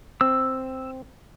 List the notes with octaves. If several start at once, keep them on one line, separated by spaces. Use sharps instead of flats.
C4 E6